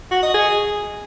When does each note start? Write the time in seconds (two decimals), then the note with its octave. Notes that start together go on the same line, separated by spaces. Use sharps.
0.11 F#4
0.22 D#5
0.34 G#4